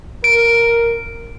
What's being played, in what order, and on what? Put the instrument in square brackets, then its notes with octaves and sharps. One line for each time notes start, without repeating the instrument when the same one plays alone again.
[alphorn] A#4 [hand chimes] D7